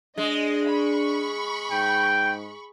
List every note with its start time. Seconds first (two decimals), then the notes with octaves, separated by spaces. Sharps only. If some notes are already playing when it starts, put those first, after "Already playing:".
0.18 G#3 D4 D#5
0.68 B5 C#6
1.71 G#2 G5